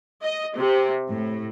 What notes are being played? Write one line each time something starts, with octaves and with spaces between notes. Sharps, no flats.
D#5
C3
A2